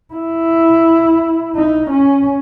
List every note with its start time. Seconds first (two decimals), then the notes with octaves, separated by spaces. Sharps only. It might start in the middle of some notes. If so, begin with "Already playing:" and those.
0.14 E4
1.56 D#4
1.90 C#4